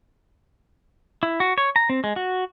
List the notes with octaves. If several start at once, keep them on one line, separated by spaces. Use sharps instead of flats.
E4
F#4
C#5
A#5
C4
G#3
F#4